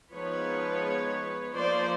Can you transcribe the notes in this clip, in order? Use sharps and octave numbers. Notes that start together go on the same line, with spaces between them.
F3 G#3 B3 D#4 B4 C#5
F3 A#3 D#4 C5 D5